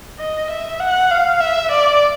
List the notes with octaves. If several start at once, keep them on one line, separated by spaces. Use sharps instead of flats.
D#5
E5
F#5
F5
E5
D5